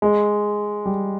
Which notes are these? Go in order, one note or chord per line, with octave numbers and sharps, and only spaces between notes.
G#3
G3